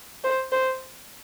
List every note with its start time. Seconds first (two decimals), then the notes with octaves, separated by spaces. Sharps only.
0.24 C5
0.52 C5